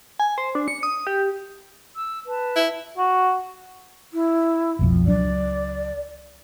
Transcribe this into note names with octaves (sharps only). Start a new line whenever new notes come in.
G#5
C5
D4
C#7
D#6
G4
E6
B4 A5
E4
F#4
E4
F1 B1 F2
C#2 F#3 D4 D5